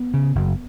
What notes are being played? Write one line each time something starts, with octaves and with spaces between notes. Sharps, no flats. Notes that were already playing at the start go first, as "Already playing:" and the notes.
Already playing: B3
C#3
F#1